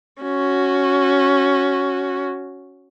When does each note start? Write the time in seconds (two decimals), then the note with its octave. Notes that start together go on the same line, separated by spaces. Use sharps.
0.22 C#4 F#4